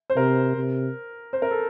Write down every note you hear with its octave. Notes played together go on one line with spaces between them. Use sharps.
C5
C3 A#4
C3
C5
A#4
A4